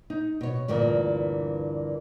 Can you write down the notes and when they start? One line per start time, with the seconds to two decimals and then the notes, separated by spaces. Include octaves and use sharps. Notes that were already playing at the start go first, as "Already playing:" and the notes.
0.10 D#4
0.41 B2 C#5
0.68 D2 G2 A#2 E3 A#3